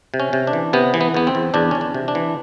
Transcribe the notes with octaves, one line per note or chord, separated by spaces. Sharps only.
C3
C#4
C3
D4
E3
C3 B3
E3
B3
E2 B3
C4
E2
E2 D4
E2 C#4
D4
C3
D4
E3